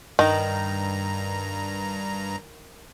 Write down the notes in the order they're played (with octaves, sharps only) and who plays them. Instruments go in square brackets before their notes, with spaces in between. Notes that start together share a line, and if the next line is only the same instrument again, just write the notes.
[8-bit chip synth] G2 A#5 [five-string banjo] D#3